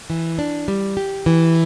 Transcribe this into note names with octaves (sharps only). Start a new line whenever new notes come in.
E3
D4
G3
G4
E3